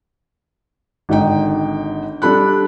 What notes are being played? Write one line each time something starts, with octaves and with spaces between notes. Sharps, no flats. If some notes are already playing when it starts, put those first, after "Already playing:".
G#1 D3 D#4 G5
G3 D4 A4 B5 F#6